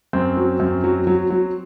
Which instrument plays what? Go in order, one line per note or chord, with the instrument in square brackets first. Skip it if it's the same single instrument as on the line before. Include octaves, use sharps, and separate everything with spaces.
[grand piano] F#2 C4
F#3
F#2
F#3
F#3
F#3